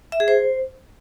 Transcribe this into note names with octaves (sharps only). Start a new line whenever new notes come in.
E5
G#4
C5